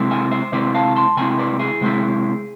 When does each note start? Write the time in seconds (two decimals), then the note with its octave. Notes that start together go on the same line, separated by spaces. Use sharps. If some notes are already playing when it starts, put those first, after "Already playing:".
Already playing: C3 G#3 C4 E4
0.11 E5 G#5
0.31 C5 E5
0.52 C3 G#3 C4 E4 B4 D5
0.74 F5 A5
0.96 A5 C6
1.17 C3 G#3 C4 E4 G#5 B5
1.39 B4 D5
1.59 E4 G#4
1.81 C3 G#3 C4 E4